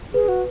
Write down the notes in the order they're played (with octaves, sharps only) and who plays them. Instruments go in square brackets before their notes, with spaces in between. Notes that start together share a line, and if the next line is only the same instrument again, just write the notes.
[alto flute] G#4 [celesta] B4
[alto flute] F#4